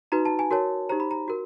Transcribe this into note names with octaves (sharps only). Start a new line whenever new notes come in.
D#4 F#4 B4 A#5
A5
G#5
F#4 A#4 C#5 A5
D#4 G4 C5 A#5
B5
A#5
F#4 A#4